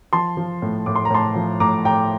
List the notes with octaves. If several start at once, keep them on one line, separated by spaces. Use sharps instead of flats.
F3 A5 C6
F3
A2
A2 D6
C6
A#5
A2 A5 C6
F3
A2 A#5 D6
A2 G5 A#5